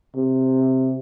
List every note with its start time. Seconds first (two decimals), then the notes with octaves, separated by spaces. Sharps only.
0.16 C3